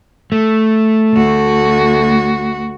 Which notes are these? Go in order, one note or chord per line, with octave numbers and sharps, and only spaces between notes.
A3
D2 F#4